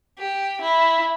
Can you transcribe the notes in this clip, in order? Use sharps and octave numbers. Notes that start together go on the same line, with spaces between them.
G4
E4